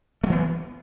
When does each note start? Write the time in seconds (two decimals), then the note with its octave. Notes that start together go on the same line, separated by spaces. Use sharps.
0.24 A3
0.27 F#3
0.30 E3
0.33 B3